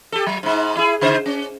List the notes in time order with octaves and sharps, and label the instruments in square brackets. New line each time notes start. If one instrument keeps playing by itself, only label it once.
[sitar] G4 A4
F#3
G#2 D#4
E4 G#4
C#3 D#4 C5
C#4